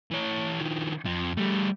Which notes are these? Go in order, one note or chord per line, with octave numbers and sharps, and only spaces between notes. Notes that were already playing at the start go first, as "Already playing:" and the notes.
E3 C#5
D#3 F3
F2 F3
G3 A3